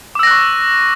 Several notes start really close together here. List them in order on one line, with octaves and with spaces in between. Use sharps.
D6 E6 A#6 F#6 C#6